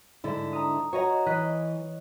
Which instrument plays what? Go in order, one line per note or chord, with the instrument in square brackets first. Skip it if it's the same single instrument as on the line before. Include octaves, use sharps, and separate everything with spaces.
[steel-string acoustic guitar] G#2 D3 E4
[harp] A#5 D#6
[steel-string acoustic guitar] F#4 [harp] C#5 D#5 A#5
[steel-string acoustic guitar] E3 [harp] D#5 F#6 B6